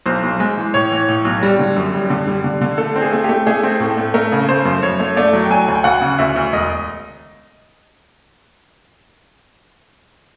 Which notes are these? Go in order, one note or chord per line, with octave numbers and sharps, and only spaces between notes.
B1 C5
B1
G#3
E3
A2 C#5
E3
A2
B1
G3
D3
F#2
G3
D3
G3
D3
D3
A3 A4
C4
G#4
A3
A3 G4
A3 G#4
C4
A2 A4
A3
A3 A#4
C#3
A3 C5
F#2
F#2 C#5
A3
A3 D5
F#3
G5
F#3 G#5
D2 G#5
G5
D2 F#5
C#3
D2 E5
D2
E1 D#5